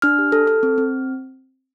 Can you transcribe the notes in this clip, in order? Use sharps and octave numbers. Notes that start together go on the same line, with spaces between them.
D4 F6
G4
A4
A4
C4
C4